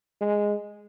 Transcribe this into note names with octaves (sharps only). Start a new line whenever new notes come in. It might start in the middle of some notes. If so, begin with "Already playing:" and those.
G#3